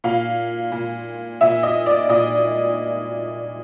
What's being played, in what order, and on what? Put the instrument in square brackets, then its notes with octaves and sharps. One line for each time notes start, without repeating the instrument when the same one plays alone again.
[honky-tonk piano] A#2 F5
A#2
A#2 E5
D#5
D5
A#2 D#5